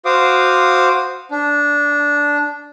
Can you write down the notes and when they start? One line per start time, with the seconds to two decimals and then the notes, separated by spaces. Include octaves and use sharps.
0.05 F#4 C5 F5 D6 D#6
1.31 D4